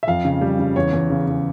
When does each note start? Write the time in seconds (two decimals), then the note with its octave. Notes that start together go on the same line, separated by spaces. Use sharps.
0.03 E5
0.07 F2 F5
0.25 C#3
0.41 G3
0.59 C#3
0.76 E2 C#5
0.92 E2
1.10 C#3
1.27 C#3